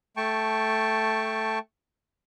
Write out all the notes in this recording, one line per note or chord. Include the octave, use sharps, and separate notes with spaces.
A3 G5 A5 C#6